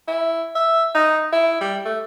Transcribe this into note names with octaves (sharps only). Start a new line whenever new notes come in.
E4
E5
D#4
E4
G3
A3